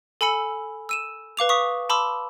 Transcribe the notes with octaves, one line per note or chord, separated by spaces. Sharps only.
A4 G#5 B5 E6 C#7
E6 D#7 E7
B4 F5 D6 F7
C#6 D#6 B6
A5 B5 C6 D6 E6